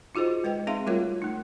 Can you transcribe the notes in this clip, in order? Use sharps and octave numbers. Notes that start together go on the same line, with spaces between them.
D#4 F4 F#4 G#4 C5 D#5
G#3 B4 D#5 G5
C4 D#4 G#4 E5 F5 C6
G3 A3 F4 F#4 A#4 C#5
A3 D#4